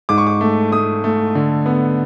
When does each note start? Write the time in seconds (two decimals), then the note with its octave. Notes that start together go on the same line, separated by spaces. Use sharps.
0.09 G#2 D6
0.18 C#6
0.27 D6
0.41 A3
0.71 A3 D#6
1.04 A3
1.35 D3
1.66 B3